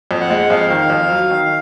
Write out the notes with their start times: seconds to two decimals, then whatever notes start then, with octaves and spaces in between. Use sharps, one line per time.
0.11 F2
0.20 F#5
0.30 G#3
0.50 F2 F5
0.70 D#3
0.90 F2
1.10 F#3
1.30 D#3